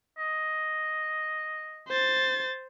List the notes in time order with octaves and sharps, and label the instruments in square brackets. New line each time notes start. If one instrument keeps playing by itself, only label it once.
[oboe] D#5
[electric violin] C5 A6